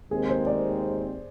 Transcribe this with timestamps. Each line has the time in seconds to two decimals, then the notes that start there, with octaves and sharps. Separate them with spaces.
0.11 D#2 D#3 G#3 C4 G#4
0.29 C5
0.47 D5